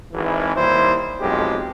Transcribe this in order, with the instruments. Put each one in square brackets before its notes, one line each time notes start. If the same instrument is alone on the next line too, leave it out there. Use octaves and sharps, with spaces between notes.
[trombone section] G#1 E3
D#2 G3 E4 C5
B1 F2 G#3 G4